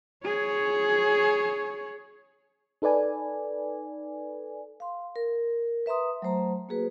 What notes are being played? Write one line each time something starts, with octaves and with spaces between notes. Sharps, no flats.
G#4 C#5
D#4 A4 B4 D5 G#5
F5 C6
A#4
B4 E5 A#5 C6 D#6
F#3 A3 C5 A#5
A#3 F#4 G#4 B4